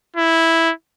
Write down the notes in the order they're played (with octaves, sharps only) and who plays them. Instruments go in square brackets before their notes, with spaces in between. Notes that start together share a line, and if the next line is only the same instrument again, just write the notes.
[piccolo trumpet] E4